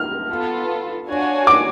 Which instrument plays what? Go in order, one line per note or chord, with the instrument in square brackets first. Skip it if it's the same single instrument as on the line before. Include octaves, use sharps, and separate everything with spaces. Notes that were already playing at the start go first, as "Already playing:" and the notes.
Already playing: [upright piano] F6
[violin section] B3 F4 A4
D4 F#4 C#5 F5 G#5
[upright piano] D6